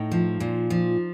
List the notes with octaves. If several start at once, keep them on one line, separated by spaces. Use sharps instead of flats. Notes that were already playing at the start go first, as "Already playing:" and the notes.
Already playing: A2 D#4
F3
A#2
F3